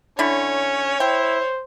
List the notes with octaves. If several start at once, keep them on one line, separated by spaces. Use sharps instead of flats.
D3 C#4 E4 C#5
E4 C5 G5